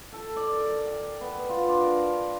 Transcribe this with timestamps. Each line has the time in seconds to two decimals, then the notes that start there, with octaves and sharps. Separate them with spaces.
0.12 A4
0.36 D5
0.55 A#4
0.86 G5
1.21 B3
1.49 F4
1.68 D4
1.81 A#4